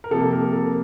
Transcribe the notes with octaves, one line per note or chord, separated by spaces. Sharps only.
A#4
C3 F3 A#3 A4
A#4
A4